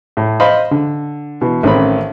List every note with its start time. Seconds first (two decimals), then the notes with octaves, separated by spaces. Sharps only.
0.17 A2
0.40 C5 D#5 F5 B5
0.71 D3
1.41 B2 E3
1.63 A1 D#3 C4 C#4 B5